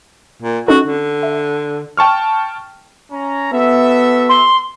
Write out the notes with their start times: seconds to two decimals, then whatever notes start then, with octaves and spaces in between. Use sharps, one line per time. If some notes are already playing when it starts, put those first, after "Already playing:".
0.42 A#2
0.68 C#4 D#4 F#4 A4
0.85 D3
1.23 E5
1.97 G5 A5 C#6 F6
3.12 C#4 A#5
3.53 B3 F#4 A4 E5
4.29 C6